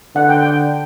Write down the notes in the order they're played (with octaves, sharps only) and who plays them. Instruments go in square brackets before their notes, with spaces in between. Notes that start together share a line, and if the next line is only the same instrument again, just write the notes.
[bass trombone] D3 [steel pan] F#5
[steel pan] G5
G5